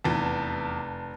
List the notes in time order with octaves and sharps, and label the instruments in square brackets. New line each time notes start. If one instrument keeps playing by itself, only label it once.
[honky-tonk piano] F1 A5 [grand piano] E2